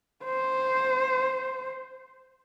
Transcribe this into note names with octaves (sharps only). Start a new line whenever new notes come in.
C5